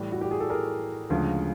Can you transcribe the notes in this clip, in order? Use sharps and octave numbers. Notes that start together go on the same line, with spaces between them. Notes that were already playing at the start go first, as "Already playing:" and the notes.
Already playing: A2 E3 G3 A4
F#4
G4
G#4
A4
G#4 A#4
D2 C#3 F3 G#3